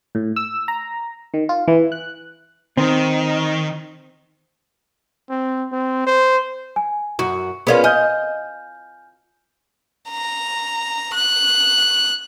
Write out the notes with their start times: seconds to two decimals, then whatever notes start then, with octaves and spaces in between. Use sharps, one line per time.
0.15 A2
0.36 E6
0.68 A#5
1.34 D#3
1.49 F4
1.68 E3
1.92 F#6
2.77 D#3 C4
5.30 C4
5.72 C4
6.07 C5
6.76 G#5
7.19 F#2 F#4 C#6
7.67 B3 C#4 F4 G#4 A#4 D5
7.84 D#5 G#5 F6 G6
10.10 A#5
11.14 F#6